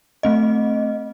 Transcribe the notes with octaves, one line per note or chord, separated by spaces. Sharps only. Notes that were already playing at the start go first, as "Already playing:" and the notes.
A3 C4 D#5